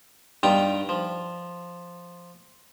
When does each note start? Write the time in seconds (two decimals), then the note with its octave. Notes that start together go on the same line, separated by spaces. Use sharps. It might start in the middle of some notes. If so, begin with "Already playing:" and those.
0.43 G2 G3 D#4 F4 G5 A#5
0.89 F3